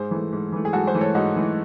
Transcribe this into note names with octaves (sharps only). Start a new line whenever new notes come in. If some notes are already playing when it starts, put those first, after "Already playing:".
Already playing: G#2 G#4 C5
E3 A3
G#2
E3 A3
G#4
G#2 F#4 A4
G#4 C5
E3 A3
A4 C#5
G#2 D#4 F#4
E3 A3